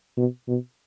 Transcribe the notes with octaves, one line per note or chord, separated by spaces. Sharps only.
B2
B2